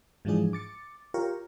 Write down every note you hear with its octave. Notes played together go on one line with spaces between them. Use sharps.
G#2 E3 F3 G#3 D4 G#4
D6 A6 C#7
F4 G4 A#4 C#5